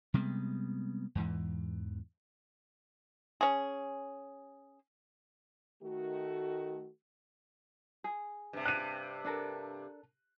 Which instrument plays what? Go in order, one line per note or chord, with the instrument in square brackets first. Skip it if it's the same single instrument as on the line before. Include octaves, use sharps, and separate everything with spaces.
[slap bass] C3 G3 G#3 B3
E2 G#2 E3
[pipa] C#4 G#4
[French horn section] D#3 A3 F#4
[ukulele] G#4
[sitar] G2 C3
[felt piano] F#6 D#7
[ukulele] D4 A4 A#4